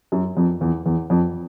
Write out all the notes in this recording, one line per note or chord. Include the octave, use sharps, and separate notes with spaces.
F#2
F2
E2
E2
F2